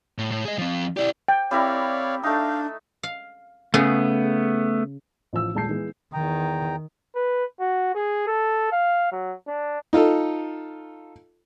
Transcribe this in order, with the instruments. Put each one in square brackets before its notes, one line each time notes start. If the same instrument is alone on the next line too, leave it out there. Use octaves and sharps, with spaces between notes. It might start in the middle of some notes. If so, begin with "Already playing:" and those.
[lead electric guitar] A2
A2
G#4 D#5
F3 C4
[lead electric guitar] E4 G4 [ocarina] D5
[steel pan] G5
[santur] G3 E4 A#4 [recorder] C4 [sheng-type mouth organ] C#5 D5 F5
[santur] A3 D#4 [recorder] D4 [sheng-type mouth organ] F5
[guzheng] F5
[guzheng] C#3 G#4 [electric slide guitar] A3 B3
[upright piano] A1 F3 E6
D#1 A#2 G#3 A5 G6 C7
E3 G#3 B3
[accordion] E2 G5 A#5 [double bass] D#3
[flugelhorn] B4
F#4
G#4
A4
F5
F#3
D4
[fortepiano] D#4 F4 A4